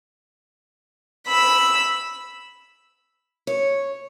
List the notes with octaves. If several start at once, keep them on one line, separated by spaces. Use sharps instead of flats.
B5 E6
C#5